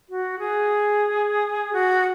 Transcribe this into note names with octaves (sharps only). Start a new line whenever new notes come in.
F#4
G#4
F#4